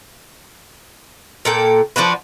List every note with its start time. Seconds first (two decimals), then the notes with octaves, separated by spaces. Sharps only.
1.45 A#2 A4 G5
1.96 F3 D4 F#4 B4